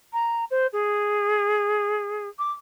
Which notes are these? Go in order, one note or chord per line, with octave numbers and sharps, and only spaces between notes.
A#5
C5
G#4
D6